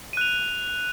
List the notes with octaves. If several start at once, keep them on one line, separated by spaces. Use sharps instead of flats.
F#6 D#7 F7